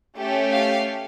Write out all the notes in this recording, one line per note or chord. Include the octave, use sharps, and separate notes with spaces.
A3 C#4 G4
F5